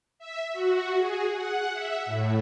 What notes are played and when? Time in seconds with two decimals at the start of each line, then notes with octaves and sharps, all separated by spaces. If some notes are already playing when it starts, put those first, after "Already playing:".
0.19 E5
0.52 F#4
0.97 G#4
1.32 F#5
1.73 E5
2.06 A2